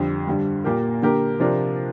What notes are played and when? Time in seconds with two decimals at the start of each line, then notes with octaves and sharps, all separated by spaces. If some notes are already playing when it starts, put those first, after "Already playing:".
Already playing: F2 D3 G3
0.27 G2 D3 G3
0.64 A#2 A#3 G4 A#4
1.02 D3 A#3 G4 A#4
1.40 C3 F3 D4 F4 A#4